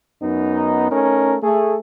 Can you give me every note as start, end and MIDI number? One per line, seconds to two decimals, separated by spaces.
0.21 0.86 42
0.21 0.86 59
0.21 0.86 63
0.90 1.35 57
0.90 1.35 61
0.90 1.35 63
0.90 1.35 70
1.43 1.77 57
1.43 1.77 68